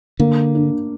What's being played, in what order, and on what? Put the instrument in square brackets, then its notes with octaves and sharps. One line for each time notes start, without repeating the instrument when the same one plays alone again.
[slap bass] D3 [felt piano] A#3
[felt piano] D4